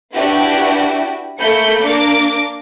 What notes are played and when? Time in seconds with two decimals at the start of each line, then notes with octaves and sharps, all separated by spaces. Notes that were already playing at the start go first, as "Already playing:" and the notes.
0.13 D4 E4 F#4 G4 B4
1.39 A3 A#3 B5 G6 C#7
1.82 A#3 D4 A#4 D6